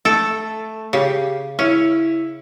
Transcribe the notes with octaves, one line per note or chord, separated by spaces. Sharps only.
A3 A4
C#3 G4
C#4 E4